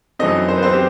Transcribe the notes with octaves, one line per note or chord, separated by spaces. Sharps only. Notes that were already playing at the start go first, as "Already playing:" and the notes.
F#2 E3 A3 C4 D#4 D#5
C5
B4
C4 C5
G4